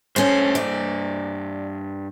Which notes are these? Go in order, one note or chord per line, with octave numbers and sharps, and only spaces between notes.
G2 A3 C#4 C5
D5